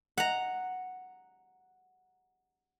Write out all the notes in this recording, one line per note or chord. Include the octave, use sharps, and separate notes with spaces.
F#5 A#5